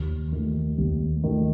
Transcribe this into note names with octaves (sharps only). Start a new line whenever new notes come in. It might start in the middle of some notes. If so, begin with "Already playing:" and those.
Already playing: D#2
D#3 A3
D#2
D#3 A3